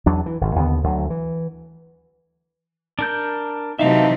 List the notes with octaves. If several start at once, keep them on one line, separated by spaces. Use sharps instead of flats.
E2 F#3 D4
E3
G#1
D#2 D3 E3 B3
D2 D3 F#3
E3
D4 A#4 G6
C3 E3 F#3 D#4 E5 F5 A5